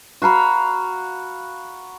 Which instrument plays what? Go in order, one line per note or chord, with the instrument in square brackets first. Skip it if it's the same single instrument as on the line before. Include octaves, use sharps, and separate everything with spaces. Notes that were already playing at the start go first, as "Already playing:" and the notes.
[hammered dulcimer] F#4 F5 A#5 B5